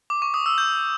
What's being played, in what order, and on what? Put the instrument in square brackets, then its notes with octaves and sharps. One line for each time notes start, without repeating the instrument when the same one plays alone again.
[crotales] D6
C#6
D#6
E6
G6